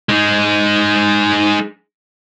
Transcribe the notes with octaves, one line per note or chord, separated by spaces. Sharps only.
G#3 D#4